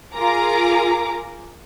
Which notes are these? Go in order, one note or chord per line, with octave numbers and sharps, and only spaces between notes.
F4 G#4 A#4 A#5 D6